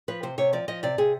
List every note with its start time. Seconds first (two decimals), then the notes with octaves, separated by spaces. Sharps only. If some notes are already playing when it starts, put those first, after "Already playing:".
0.08 F3 B4
0.23 C3 C5
0.38 C3 C#5
0.53 F3 D5
0.68 F3 D#5
0.83 C3 D5
0.98 C3 G#4